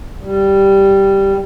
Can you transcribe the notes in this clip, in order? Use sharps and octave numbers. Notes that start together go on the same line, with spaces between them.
G3